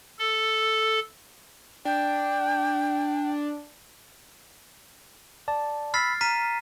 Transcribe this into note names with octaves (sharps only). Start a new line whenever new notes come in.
A4
D4 G5
D5 A5
B5 E6 F6 A6 B6 C7
A#5 F6 B6 D#7